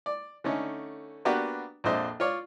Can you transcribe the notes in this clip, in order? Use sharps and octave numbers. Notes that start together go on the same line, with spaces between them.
D5
D3 A3 C#4 D#4
A#3 B3 D4 F#4 G4 B4
A#1 F2 D4 C5 D#5 E5
F4 C#5 D5